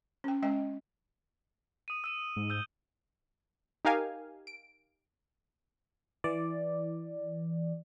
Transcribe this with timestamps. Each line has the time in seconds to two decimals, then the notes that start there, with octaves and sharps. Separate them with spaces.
0.24 C#4 G5
0.42 G#3 C#4 D#5 G5
1.88 D#6 D#7
2.04 E6 D#7 E7
2.36 G#2
2.50 E6 G6 G7
3.85 D#4 G4 A#4 F5 G#5
4.47 D7
6.24 E3 D5